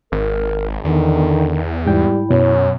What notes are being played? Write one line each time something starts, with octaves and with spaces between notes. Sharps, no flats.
G#1 A#4
E2 D3 D#3
G#2 G3 E4 G5
F#2 B2 C#5